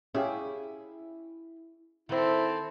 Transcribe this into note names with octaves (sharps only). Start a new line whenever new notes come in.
C#4 E4 G4 G#4 F5
D#3 C4 E4 A4 C5